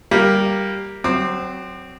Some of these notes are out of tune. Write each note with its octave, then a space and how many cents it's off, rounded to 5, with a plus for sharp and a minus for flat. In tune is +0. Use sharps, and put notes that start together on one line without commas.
G3 +0 A#3 +0
F#3 +20 C4 +0 D6 +45